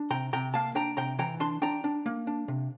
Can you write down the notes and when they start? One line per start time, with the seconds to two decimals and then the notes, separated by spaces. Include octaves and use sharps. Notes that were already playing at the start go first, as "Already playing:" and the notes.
Already playing: D4
0.10 C3 G5 A#5
0.33 C3 G5 A#5
0.54 A#3 F5 A5
0.75 D4 G5 A#5
0.97 C3 G5 A#5
1.19 E3 G5 A#5
1.40 D4 A5 C6
1.62 D4 G5 A#5
1.84 D4
2.06 A#3
2.27 D4
2.48 C3